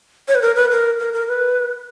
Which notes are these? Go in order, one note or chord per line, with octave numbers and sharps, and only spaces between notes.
C#5
B4
A#4
B4
A#4
A#4
A#4
B4